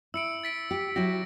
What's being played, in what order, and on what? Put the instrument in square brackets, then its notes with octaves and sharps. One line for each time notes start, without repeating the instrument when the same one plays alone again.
[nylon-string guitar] E4 [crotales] E6 C#7 D7
[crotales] A6 B6 D7
[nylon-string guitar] G4
[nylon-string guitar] F#3 E4 G4 [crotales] A#6